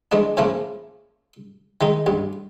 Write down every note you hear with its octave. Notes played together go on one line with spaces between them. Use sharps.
E3 G#3 A3 D4
A2 C#3 E3 F3 A3 A#3
D#3 G#3 D#4
A1 G2